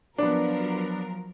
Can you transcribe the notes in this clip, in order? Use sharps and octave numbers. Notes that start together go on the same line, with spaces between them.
F3 F#3 B3 D4 A#4